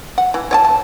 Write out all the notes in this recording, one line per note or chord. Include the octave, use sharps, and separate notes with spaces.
F#5
E3
C#5 D5 A5
A5